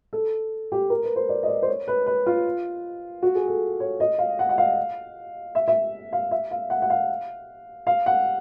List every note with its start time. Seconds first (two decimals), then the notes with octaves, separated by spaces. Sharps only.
0.13 A4
0.72 G4
0.90 A#4
1.03 B4
1.16 C5
1.29 D5
1.43 D#5
1.48 D5
1.62 C5
1.68 C#5
1.88 B4
2.06 B4
2.26 F4
3.23 F#4
3.35 G#4
3.48 A4
3.80 C#5
4.00 D#5
4.19 F5
4.39 F#5
4.49 F#5
4.58 F5
5.55 E5
5.68 E5
6.13 F5
6.31 E5
6.51 F5
6.70 F#5
6.82 F#5
6.90 F5
7.87 F5
8.06 F#5